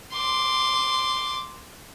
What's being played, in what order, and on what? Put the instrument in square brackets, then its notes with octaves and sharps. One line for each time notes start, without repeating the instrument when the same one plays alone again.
[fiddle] C6 D6